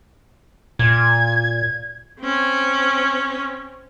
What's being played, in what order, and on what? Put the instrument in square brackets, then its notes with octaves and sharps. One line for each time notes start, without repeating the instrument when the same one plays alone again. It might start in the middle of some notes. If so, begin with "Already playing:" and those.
[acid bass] A#2 [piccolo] G#6
[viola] C4 C#4